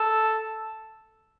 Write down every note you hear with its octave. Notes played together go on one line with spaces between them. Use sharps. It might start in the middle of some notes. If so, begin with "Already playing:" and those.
Already playing: A4